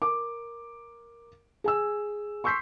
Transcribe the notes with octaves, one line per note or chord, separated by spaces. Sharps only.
A#4 D6
G#4 G#5 E6
C6 C#6 E6 G6 B6 C7